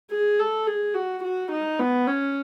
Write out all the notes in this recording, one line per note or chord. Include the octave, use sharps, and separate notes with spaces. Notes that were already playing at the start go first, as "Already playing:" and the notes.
G#4
A4
G#4
F#4
F#4
D#4
B3
C#4